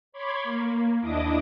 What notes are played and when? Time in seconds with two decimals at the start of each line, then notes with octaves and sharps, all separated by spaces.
0.12 C#5 B5 C6 D6 G#6
0.44 A#3
1.01 D#2 D4 E4 D#5 D6 D#6